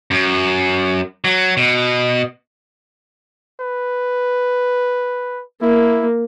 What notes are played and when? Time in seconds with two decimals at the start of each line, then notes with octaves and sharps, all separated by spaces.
0.11 F#2
1.25 F#3
1.57 B2
3.60 B4
5.62 A#3 E4